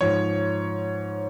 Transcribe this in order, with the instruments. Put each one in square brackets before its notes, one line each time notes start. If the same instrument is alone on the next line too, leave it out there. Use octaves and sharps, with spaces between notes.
[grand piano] G#2 F3 C#5